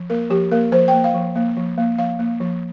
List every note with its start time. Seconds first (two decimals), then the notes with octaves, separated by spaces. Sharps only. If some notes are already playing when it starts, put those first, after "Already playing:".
Already playing: F3
0.10 A#3 A#4
0.30 F3 G4
0.52 A#3 A#4
0.72 F3 C5
0.88 G5
0.93 A#3
1.04 F5
1.14 F3
1.36 A#3
1.56 F3
1.78 A#3
1.98 F3 F5
2.19 A#3
2.40 F3